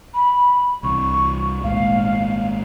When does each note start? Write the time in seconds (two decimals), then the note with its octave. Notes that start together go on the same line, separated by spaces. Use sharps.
0.14 B5
0.83 C2 C3 E3 C#6
1.63 G#1 A#2 G#3 F5